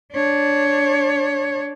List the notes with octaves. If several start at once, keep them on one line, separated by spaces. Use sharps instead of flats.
D4 C#5